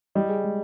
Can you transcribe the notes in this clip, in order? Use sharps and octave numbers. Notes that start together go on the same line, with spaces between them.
G3 D#5
G#4
G#3